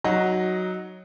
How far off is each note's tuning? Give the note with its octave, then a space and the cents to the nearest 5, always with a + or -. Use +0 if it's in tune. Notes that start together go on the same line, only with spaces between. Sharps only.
F#3 +0 D#4 +5 F#4 +0